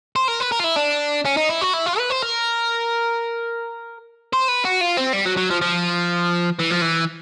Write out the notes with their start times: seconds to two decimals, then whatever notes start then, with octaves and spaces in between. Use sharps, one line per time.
0.16 C5
0.28 A#4
0.40 B4
0.52 A#4
0.60 F4
0.64 E4
0.76 D4
1.25 C#4
1.37 D#4
1.49 E4
1.61 F#4
1.74 E4
1.86 F4
1.98 B4
2.10 C5
2.22 A#4
4.33 C5
4.48 B4
4.65 F#4
4.81 F4
4.97 C4
5.13 G3
5.26 F#3
5.37 F#3
5.51 F3
5.62 F3
6.59 E3
6.70 F3
6.81 E3